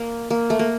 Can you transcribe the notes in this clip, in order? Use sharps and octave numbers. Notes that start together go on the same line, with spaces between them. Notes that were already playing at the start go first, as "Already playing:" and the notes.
Already playing: A#3
A#3
A3
A#3